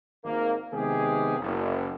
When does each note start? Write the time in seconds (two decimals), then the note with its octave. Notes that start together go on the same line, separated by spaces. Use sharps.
0.25 G#1 A#3
0.73 C3 D#3 G#3 B3 G4 G#4
1.39 F#1